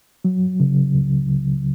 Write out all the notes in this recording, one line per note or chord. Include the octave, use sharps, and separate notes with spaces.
F#3
C#3
C#2
C#2